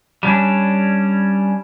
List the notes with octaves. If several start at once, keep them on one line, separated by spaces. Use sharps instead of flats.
G3 C#4 D4